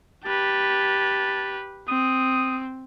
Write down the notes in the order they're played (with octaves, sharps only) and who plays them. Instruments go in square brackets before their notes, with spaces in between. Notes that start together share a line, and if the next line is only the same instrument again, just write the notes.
[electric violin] G4 B4 [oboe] A5
[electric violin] C4 [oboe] D#6